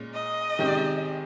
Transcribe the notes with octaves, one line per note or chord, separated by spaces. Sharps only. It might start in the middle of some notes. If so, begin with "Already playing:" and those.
Already playing: A#2 G#3 C#4
D#5
C3 D#3 G#3 C#4 G4